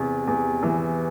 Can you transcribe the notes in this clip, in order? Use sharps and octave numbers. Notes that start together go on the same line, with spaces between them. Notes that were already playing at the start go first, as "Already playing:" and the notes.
Already playing: E2 C3
E2
E3